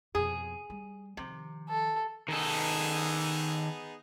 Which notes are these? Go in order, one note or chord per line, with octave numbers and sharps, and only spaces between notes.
F2 B2 G#4
G3
C3 D#3 F3
A4
D#3 B3 D#4 G#4 A4